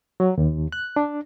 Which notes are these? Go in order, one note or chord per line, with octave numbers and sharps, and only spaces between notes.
F#3
D#2
F#6
D4